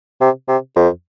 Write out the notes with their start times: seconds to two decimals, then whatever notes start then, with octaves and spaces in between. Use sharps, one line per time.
0.21 C3
0.48 C3
0.76 F2